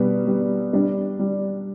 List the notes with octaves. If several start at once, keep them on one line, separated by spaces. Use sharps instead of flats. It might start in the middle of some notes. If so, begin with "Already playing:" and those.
Already playing: B2 G3 B3
G3
G3 D4
G3